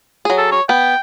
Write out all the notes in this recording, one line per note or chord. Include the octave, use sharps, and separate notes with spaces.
F#3 G#4
A4
C#5
B3 G5